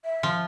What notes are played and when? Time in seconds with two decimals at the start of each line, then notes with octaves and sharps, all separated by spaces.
0.05 E5
0.23 F3